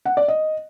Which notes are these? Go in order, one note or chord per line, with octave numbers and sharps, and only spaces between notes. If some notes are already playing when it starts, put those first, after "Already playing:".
F#5
D5
D#5